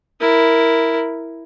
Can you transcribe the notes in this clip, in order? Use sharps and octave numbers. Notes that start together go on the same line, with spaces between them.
E4 A#4